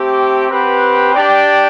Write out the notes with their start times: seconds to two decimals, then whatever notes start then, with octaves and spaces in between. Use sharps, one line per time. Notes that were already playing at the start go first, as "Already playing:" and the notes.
Already playing: A3 C4 G4
0.48 C4 G4 B4 F#5
1.12 D4 G4 D5 G5